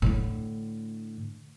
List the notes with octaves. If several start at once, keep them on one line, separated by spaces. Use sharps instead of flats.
A2 D3